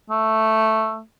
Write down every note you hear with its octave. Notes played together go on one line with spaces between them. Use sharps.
A3